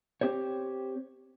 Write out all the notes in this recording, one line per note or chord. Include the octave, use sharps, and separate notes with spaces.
C4 G4 C5 C#5